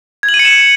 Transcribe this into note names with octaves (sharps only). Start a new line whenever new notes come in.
G#6
F#7
D#7
C#7
E7